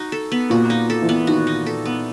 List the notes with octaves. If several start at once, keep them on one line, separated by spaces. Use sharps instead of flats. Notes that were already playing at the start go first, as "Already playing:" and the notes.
Already playing: D#4 F#4
A4
B3
A#2 F#4
D#4
A4
E3
B3
D#3 F#4
D#4
A4
B3